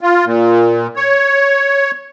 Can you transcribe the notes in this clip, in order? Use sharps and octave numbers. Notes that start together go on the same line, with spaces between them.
F4
A#2
C#5